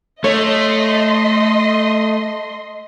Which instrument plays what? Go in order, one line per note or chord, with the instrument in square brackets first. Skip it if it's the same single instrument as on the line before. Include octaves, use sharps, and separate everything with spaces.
[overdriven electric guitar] A3 [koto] C#5 [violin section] D#5 C6